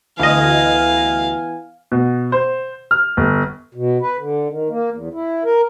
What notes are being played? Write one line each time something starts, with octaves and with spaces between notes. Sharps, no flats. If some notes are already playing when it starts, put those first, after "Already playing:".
D2 E3 B3 D#5 F5 G#5
B2
C5
F6
G1
B2
B4
D3
D#3
A#3
E2
E4
A#4